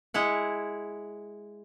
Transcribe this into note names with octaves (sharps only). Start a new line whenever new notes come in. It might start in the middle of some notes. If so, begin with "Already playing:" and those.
G#3 E4 F#5